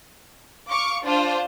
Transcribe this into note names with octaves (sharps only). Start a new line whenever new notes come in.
F5 C#6 D6
D4 F4 C5